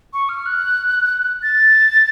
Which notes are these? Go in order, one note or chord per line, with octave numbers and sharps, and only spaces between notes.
C#6
F6
F#6
A6